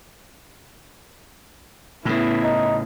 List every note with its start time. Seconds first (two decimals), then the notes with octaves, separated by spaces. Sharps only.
2.05 A2 C#3 B3 E4
2.43 D#4